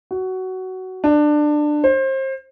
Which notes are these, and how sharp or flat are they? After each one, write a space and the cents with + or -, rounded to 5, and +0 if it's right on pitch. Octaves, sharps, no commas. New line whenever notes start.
F#4 +15
D4 +20
C5 +30